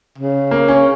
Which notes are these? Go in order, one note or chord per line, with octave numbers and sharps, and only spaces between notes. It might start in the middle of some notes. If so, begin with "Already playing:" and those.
C#3
A#3
C#4